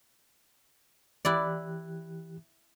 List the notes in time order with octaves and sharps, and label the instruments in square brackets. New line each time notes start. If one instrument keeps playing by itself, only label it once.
[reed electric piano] E3 G4 F#6 [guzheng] E4 D5